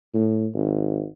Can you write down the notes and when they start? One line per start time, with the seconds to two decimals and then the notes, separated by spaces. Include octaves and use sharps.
0.14 A2
0.55 G#1